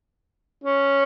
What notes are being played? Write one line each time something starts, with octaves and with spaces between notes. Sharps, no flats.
C#4